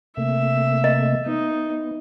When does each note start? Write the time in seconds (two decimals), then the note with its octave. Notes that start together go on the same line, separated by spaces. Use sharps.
0.17 C3 A3 A#3 E5
0.84 D#5
1.26 B3 D#4